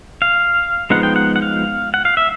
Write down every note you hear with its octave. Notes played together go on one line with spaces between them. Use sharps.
F5
F3 G#3 B3 D#4 F#5
G5
F#5
F#5
F5
F#5
F5
E5